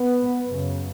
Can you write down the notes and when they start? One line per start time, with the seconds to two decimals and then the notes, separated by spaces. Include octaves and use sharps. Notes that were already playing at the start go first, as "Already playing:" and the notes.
Already playing: B3
0.48 F#2 C#3